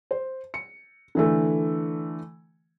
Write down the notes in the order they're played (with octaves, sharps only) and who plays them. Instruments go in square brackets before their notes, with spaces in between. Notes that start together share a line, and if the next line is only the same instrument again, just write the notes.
[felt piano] C5
C#7
D3 E3 A3